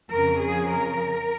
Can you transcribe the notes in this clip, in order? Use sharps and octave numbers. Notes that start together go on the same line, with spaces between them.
F2 C#3 F3 A#4
G#4
A#4